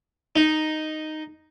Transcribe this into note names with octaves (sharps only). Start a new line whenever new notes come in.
D#4